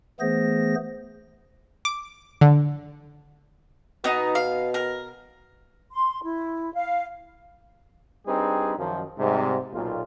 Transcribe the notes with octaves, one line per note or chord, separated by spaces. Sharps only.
E3 A3 B3 G#4 C5 A#6
D6
D3
B2 B3 D#4
F5
A#4
C6
E4
F5
G3 C4 D4 D#4 G#4 B4
F#2 D#3 F3
G#2 C3 G3
B1 A#2 F4